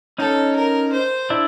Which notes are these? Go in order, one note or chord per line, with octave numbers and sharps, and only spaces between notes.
C#4 D#4 A4
A#4
C5
D4 E4